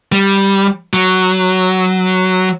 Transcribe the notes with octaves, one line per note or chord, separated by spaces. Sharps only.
G3
F#3